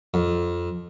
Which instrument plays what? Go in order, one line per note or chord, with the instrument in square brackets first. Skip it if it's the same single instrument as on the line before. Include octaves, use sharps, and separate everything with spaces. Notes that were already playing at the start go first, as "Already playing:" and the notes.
[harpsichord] F2